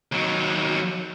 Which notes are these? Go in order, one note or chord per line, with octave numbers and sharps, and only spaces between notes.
D#2 F#3